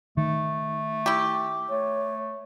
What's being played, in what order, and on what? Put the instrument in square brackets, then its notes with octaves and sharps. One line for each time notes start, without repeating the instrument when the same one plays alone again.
[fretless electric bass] D#3 [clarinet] A3
[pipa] E4 G4
[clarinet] A3 [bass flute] C#5